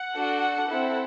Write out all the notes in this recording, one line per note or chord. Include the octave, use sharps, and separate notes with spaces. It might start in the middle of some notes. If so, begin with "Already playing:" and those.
Already playing: F#5
D4 F#4 A4
C4 E4 A4